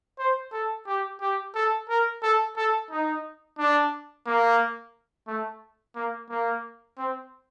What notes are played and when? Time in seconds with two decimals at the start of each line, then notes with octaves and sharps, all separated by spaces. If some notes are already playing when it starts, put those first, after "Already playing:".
0.19 C5
0.52 A4
0.86 G4
1.21 G4
1.54 A4
1.89 A#4
2.22 A4
2.56 A4
2.90 D#4
3.58 D4
4.26 A#3
5.27 A3
5.95 A#3
6.29 A#3
6.98 C4